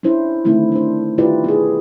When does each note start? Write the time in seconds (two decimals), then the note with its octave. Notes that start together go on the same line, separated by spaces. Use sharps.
0.03 C#4 D4 E4 C5
0.45 D3 D#3 A3 C4 E4
0.72 D4 C5
1.18 D#3 E4 F4 G4 B4 D5
1.44 B3 G#4